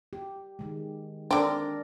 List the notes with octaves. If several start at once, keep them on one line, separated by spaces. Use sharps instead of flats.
G4
D#3 G#3
D3 C4 D4 A#4